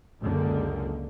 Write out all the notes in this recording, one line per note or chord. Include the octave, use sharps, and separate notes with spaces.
C#2 F#2 D3 A#3